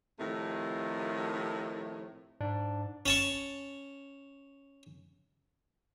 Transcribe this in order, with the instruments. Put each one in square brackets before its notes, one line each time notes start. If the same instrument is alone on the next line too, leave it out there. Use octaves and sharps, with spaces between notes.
[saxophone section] A2 C3 D#3 F3 A3
[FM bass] G#2 [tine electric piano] D4
[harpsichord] C#4 A5 C#6